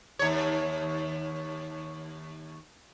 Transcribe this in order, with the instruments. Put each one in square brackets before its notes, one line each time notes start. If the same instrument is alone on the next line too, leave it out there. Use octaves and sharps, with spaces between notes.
[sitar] D#2 C#5